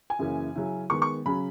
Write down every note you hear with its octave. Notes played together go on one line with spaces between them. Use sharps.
G#5
F#2 C#3 E3 A#3 C#4
C#3 F#3 C#4 E4
D#3 G#3 B3 C#6
C#6
C#3 F#3 C#4 B5